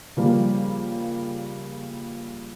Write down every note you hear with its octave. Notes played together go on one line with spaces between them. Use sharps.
C#3 F3 G3 A#3